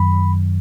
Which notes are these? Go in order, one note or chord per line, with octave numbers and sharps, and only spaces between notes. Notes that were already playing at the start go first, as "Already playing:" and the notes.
Already playing: F#2 D#3 F#3 B5